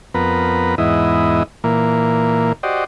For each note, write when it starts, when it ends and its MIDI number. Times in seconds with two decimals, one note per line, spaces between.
0.14 0.75 41
0.14 0.75 59
0.14 0.75 70
0.14 0.75 71
0.78 1.43 40
0.78 1.43 44
0.78 1.43 59
0.78 1.43 64
0.78 1.43 75
1.64 2.52 46
1.64 2.52 52
1.64 2.52 58
2.63 2.84 66
2.63 2.84 67
2.63 2.84 72
2.63 2.84 74
2.63 2.84 75